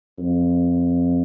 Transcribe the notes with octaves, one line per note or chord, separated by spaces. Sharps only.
F2